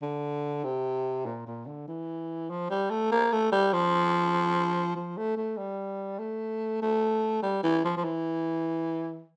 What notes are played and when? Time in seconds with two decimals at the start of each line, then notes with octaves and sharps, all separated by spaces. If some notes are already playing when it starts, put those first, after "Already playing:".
0.02 D3
0.64 C3
1.26 A#2
1.47 A#2
1.67 D3
1.88 E3
2.50 F3
2.71 G3
2.91 A3
3.12 A#3
3.32 A3
3.52 G3
3.73 F3
4.96 F3
5.18 A3
5.37 A3
5.58 G3
6.19 A3
6.82 A3
7.43 G3
7.63 E3
7.85 F3
7.97 F3
8.04 E3